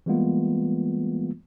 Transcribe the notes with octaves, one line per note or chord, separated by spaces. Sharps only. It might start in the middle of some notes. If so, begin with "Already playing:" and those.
E3 G3 G#3 A#3 B3 F4